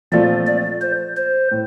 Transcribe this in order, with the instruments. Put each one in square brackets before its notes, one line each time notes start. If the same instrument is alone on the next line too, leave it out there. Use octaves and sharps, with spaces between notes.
[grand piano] A#2 F3 A3 C4 F4 [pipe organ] D5
[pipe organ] D5
C5
C5
[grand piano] A2